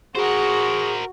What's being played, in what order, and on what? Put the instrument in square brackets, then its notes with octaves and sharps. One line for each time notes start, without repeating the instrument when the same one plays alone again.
[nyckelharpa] F#4 F#5 [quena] G#4 [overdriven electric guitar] A#4 C5